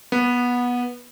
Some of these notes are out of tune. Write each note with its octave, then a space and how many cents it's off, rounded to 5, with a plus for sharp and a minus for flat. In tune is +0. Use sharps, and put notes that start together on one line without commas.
B3 -15